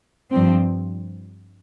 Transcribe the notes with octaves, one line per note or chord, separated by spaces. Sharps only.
G2 F3 C4